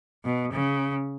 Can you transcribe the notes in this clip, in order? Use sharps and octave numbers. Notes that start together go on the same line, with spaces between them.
B2
C#3